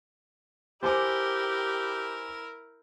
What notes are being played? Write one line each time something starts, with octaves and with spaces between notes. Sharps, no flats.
E4 G4 A#4 C5 G#5 D6